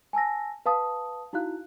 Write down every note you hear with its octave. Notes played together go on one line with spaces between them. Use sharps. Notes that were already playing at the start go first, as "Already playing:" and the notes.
G#5 A5 E6 A#6
B4 F5 A5 D#6
D#4 E4 F#4 F5 F#6